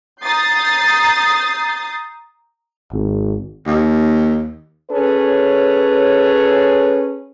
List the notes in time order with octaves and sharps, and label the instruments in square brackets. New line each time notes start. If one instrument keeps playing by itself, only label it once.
[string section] A#5 D#6 G6 A6 C7
[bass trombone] G#1
[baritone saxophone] D#2
[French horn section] C#4 G#4 A4 B4 C#5